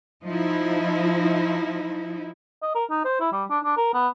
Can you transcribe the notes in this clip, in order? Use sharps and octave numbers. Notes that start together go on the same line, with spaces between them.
F3 D#4 E4
D#5
A#4
D#4
C5
E4
G3
D4
D4
A#4
B3